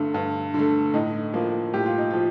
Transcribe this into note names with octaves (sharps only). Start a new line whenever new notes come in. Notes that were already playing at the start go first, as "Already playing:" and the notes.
Already playing: G2 D3 A3
G2
D3 A3
A2 D#4
F3 A#3
A2 G4
F4
D#4
F3 F4